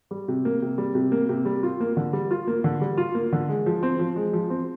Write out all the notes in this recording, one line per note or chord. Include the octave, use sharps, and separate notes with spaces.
G3
C3
A#3
C3
G3
C3
A#3
C3
G3
F4
A#3
D3
G3
F4
A#3
D3
G3
F4
A#3
D3
G#3
F3
C4
F3
G#3
F3
C4